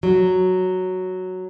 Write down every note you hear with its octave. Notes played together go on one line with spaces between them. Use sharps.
F#3